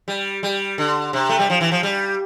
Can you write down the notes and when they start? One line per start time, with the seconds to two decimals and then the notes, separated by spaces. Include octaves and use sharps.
0.08 G3
0.43 G3
0.78 D3
1.13 C3
1.29 A3
1.39 G3
1.50 F3
1.61 E3
1.72 F3
1.83 G3